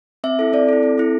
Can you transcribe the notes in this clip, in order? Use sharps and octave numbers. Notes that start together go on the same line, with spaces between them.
C4 E5
E4 A4
C4 D5
E4 A4
C4
E4 A4